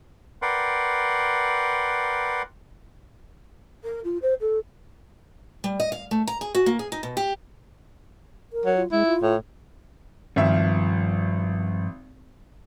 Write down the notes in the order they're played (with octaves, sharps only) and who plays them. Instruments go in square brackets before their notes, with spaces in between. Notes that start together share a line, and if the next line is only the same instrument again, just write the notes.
[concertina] A#4 B4 D5 F#5 G5 C6
[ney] A#4
F4
C5
A4
[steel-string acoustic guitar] G3
D#5
F5
A3
A#5
G#4
F#4
A#3
G#4
D#4
B2
G4
[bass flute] A#4
[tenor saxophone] F#3
[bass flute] F4
[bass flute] G#3 [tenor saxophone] E4
[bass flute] F4
[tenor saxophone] A2
[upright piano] G#1 E5 [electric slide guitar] G2 F3